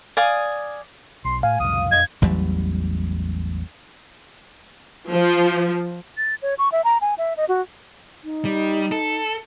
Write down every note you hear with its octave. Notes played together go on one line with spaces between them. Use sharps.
D5 F5 G#5 D#6
B1 C6
A2 F5 G#5
C#2 F#2 C3 D#6
F2 F#3 D4 D#5 G#6
A1 E2 F#3 G3
F3
A6
C#5
C#6
E5
A#5
G#5
E5
D#5
F#4
D#4
G3
A4